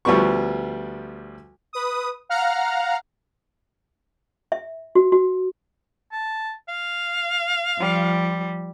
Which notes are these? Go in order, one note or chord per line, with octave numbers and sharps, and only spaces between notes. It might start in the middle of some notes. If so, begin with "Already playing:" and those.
D2 F3 G3 B3 C#6
B4 D#6
F5 F#5 A#5 F6
E5
F#4
F#4
A5
F5
F3 G3